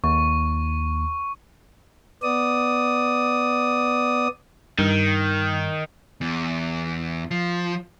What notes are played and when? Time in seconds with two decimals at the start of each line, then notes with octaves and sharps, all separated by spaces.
0.04 D#2 C#6
2.23 B3 D5 D#6
4.79 G2 D#3 G6
6.21 E2
7.31 F3